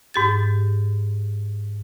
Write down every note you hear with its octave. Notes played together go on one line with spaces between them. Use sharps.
G#2 G4 A6